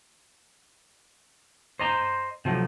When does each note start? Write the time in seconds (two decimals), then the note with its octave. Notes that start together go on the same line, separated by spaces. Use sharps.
1.79 C5 D#5 A#5 C6
2.45 C3 F3 F#3 A3